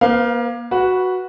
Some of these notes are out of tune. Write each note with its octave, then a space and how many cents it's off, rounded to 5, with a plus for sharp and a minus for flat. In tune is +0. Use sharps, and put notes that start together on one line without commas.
A#3 +35 C5 -45 F5 +5
F#4 +0 B4 -10